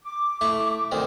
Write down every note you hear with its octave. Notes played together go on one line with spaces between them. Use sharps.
D6
A3 E4 C#6
D2 D#3 C4